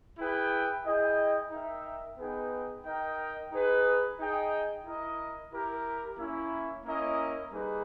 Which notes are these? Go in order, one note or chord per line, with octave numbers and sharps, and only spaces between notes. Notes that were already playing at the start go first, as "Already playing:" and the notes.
E4 G#4 B4 G5
E4 G#4 D#5 G5
D#4 A#4 E5 G5
B3 D#4 G#4 B4 G5
D#4 A#4 D#5 G5
D#4 G#4 B4
D#4 G#4 D#5 G5
E4 A#4 D#5
E4 G4 A#4
A#3 C#4 E4
A#3 C#4 E4 A#4 D#5
G3 A#3 D#4 G#4 B4